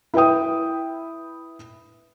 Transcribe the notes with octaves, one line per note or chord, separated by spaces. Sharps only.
E4 B4 E5 G5 D#6